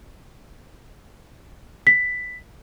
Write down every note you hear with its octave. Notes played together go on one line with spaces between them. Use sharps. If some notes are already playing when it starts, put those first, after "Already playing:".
B6